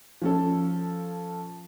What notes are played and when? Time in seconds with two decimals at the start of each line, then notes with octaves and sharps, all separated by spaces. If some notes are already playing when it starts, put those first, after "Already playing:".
0.22 F3 C#4 A4